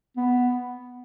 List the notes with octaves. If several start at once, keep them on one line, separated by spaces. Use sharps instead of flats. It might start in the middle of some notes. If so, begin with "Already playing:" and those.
B3